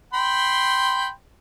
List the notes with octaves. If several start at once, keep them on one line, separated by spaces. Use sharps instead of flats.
G5 B5 C6